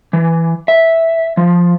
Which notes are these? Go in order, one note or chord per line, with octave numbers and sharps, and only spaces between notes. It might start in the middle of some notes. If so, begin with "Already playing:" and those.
E3
E5
F3